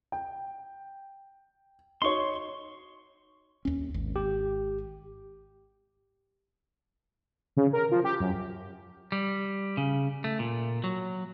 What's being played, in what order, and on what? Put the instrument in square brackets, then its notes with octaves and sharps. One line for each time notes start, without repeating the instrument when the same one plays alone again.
[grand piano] G5
[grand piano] D#4 F#4 C#5 [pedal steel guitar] C6 C#6
[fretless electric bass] D#2 C#4
G#1
[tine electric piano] G4
[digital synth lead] C#3
A#4
F3
G4
F#2
[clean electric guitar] G3
C#3
A3
A#2
F#3